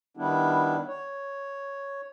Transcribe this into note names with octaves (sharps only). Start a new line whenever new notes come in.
D#3 G3 B3 D4 E4
C#5